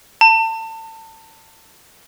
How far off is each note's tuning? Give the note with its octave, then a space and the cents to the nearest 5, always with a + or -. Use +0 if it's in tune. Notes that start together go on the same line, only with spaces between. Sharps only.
A5 +30